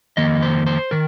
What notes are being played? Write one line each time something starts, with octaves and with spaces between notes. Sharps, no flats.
F2 D#3 A#3 D#5
C5
C5
D#3 A#4